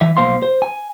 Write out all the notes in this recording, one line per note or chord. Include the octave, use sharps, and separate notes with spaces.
E3 E5
B1 A#3 C5 F5 C6
C5
G#5